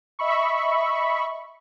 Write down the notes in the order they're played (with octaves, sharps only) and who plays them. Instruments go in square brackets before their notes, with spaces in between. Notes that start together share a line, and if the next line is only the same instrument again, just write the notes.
[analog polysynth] D#5 E5 B5 C#6